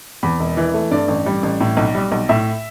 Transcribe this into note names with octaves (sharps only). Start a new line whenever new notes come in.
E2 B5
E1
E3
A3
G2 D5
A1
G3
A1
A2
B1
G3
B1
A2 E5